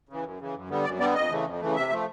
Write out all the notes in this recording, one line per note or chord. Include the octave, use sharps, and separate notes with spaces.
C#3 E3
F#2
C#3 E3
F#2
D3 G3 B3
F#2 D5
D3 G3 B3 D5
F2 D#5
C#3 E3 A3
F2
C#3 E3 A3
C3 E5
F3 A3